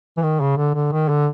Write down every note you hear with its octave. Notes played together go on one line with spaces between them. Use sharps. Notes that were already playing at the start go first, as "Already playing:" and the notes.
E3
D#3
C#3
D3
D3
D#3
D3